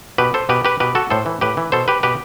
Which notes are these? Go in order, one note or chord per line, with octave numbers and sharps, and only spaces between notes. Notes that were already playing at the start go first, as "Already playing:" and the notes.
B2 G4 B4
A4 C5
B2 G4 B4
G4 B4
B2 G4 B4
F#4 A4
A2 A4 C5
E3
A2 G4 B4
E3
B2 A4 C5
G4 B4
B2 G4 B4